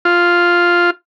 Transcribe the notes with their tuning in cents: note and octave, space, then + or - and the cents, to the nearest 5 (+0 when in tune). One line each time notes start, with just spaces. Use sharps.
F4 +0